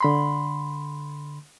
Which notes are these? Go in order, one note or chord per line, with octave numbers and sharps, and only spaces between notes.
D3 B5 C6